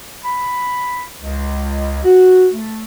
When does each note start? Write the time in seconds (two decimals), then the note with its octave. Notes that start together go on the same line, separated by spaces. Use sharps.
0.23 B5
1.19 C#2
2.04 F#4
2.51 A3